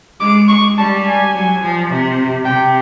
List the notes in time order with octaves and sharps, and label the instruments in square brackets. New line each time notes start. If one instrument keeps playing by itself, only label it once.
[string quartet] G#3 [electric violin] D6
[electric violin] C#6
[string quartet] G3 [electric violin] A5
[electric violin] G#5
[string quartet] F#3
F3
C3
[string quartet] C3 [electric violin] G5